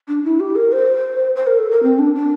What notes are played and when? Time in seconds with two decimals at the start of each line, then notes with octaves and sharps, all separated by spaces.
0.08 D4
0.25 E4
0.40 G4
0.56 A#4
0.72 C5
1.36 C5
1.47 A#4
1.58 A4
1.71 A#4
1.83 C4
1.99 D4
2.15 D4